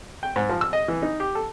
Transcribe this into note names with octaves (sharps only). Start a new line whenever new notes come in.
G5
G#2
F3
E6
D#5
E3
D#4
G4
A4